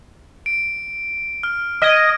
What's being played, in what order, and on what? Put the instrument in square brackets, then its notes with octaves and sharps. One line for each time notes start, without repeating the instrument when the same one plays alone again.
[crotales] D7
F6
[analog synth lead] D#5 [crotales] F6 G#6